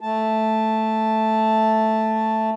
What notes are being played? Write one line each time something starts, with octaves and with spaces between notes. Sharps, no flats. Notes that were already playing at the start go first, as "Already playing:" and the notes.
A3 A5